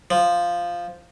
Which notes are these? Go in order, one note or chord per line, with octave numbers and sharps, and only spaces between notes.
F3